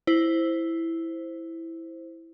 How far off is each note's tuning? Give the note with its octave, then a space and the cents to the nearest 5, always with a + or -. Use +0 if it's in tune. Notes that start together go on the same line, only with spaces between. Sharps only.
E4 +0 C5 +0